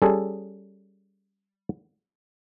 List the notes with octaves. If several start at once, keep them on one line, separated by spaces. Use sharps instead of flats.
G3 C#4 G#4 A4